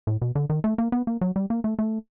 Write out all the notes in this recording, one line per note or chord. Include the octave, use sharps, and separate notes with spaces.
A2
B2
D3
D#3
A3
A#3
B3
A#3
F#3
G3
A#3
A3
A3